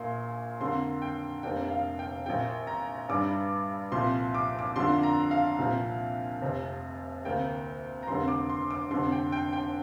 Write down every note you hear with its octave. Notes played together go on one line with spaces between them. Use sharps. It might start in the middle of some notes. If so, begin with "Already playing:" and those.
Already playing: A#1 A#2 A#3 C6
F2 D3 A#3 C6
G5
F1 F2 C3 A#3 D4 G5
F5
G5
A#1 A#2 A#3 G5
A#5
G2 G3 D4 D6
C2 A#2 F3 C4 C6
D6
D6
F2 D3 F3 A#3 D4 C6
A#5
F5
C2 A#2 F3 C4
F1 F2 C3
D2 C3 A#3 G5
A#5
F1 F2 D3 A#3 C6
D6
C6
D6
F1 F2 D3 C6
G5
G5
G5